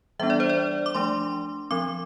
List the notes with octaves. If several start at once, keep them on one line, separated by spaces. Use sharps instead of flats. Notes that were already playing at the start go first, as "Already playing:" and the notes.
E3 G3 B3 D4 E5
D5
C5
D5
D6
F3 A3 D4 C6
F3 C4 D6